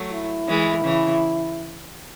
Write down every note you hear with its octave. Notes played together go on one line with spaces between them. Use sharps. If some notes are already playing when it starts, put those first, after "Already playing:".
Already playing: F#3 A3
E4
E3 G#3
C#3 E3